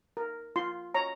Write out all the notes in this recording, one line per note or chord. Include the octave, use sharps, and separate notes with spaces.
A#4
F4 C6
C#5 A#5